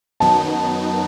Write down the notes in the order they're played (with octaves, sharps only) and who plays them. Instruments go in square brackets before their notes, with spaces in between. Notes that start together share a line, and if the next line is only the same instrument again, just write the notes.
[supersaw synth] F#2 D#3 F#3 B3 D#4 [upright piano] A5